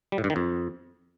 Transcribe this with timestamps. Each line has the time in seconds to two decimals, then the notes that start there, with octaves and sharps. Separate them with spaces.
0.12 G3
0.18 A2
0.24 G2
0.30 D#3
0.36 F2